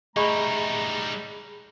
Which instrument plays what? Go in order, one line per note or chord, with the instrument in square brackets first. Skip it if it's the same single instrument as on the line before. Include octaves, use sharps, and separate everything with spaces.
[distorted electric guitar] G3 D#4 [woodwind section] A3 A#5 [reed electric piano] G#4 B5 [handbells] D#5 C#6